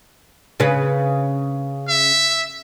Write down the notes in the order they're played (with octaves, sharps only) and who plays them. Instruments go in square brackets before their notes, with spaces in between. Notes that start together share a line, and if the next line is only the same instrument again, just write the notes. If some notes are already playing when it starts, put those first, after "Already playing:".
[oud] C#3 B4
[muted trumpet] E5